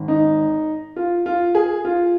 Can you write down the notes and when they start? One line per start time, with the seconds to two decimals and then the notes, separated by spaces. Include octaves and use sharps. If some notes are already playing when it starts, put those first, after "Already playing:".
Already playing: G#1 G#2 D#3
0.08 D#4
0.96 F4
1.26 F4
1.55 G#4
1.85 F4